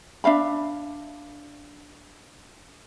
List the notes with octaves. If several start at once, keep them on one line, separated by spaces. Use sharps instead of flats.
D4 E5 F5 B5